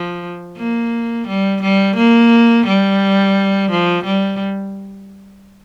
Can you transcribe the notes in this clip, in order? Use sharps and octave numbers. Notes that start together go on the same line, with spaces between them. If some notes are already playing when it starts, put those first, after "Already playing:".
Already playing: F3
A#3
G3
G3
A#3
G3
F3
G3